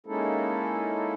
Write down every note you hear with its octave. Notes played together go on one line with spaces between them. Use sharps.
G#3 A#3 C#4 D#4 E4 A4